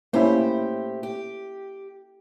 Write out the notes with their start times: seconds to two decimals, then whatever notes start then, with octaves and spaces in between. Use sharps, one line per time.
0.13 A2 A#3 C#4 E4 G4 C5
1.03 G4